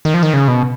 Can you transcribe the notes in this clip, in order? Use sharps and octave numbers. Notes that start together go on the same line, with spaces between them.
D#3
F3
D#3
C#3
B2